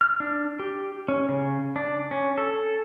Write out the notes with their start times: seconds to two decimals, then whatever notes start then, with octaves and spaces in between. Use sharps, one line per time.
0.01 F6
0.20 D4
0.59 G4
1.08 C#4
1.29 C#3
1.76 D4
2.11 C#4
2.38 A4